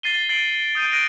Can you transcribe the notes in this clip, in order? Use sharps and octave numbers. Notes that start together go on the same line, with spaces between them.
A6 C7 D#7 G7
A6 C7 D7 F#7
G7
D#6 G6 D7 D#7
F#6 A#6 D7 D#7